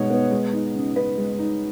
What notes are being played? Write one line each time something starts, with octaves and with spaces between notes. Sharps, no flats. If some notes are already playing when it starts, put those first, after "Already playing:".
Already playing: B2 G#3 B3 D#4 C#5
B3
G#3
D#4
C#3
C#3 B4
G#3
D#4